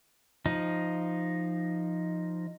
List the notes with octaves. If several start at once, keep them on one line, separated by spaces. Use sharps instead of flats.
F3 D#4